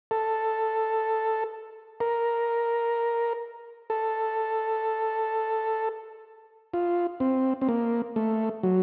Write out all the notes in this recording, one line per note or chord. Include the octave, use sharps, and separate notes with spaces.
A4
A#4
A4
F4
C4
C4
A#3
A3
F#3